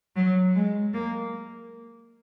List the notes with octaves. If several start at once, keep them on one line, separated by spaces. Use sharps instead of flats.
F#3
G#3
A#3